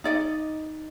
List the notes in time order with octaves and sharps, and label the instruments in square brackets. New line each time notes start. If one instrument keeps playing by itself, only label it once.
[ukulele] D#4 D5 D#5